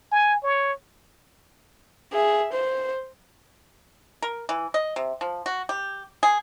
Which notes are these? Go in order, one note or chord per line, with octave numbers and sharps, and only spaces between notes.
G#5
C#5
G#4 E5
C5
A#4
E3
D#5
C3
F3
F#4
G4
G#4